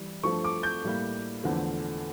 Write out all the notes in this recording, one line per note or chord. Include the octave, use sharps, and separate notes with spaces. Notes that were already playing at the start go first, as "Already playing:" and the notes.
Already playing: E3 G3
G2 F3 A3 C#6
D6
G6
A2 G3 A#3
E2 D3 F3 A3